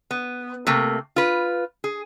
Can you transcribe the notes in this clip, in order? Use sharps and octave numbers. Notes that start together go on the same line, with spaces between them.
B3
C3 A3 A#3
F4 B4
G#4